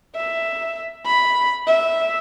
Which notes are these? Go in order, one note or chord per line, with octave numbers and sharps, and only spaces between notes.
E5
B5
E5